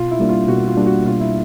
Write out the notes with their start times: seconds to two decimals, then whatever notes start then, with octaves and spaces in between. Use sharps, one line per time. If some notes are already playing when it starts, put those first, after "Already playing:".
Already playing: B2 F4
0.11 E4
0.19 G3 A#3 D4
0.29 F4
0.48 B2 F#4
0.68 F4
0.77 G3 A#3 D4
0.86 F#4
1.06 B2 F4
1.20 E4